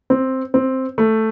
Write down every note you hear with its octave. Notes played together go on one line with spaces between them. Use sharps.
C4
C4
A3